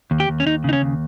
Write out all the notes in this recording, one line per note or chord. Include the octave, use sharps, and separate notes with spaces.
D#2
G4
D#2
C#4
D#2 D#4
C#3 D#4
C#4
D#2